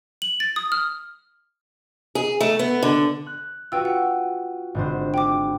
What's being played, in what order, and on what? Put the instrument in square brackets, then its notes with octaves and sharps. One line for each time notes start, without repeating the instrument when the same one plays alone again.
[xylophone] F#7
A6
D#6
F6
[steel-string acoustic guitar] G#4
A3
B3
D3
[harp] F#6
[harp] F4 F#4 [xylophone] B4 G5 E6
[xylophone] F#5
[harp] G#1 D3 C5
[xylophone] G5 D6